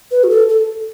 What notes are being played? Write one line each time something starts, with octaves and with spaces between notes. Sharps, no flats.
B4
F#4
A4
A4